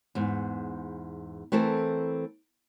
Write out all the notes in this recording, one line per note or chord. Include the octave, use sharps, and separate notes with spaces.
E2 G#2
E3 A3 C4 A4 A#4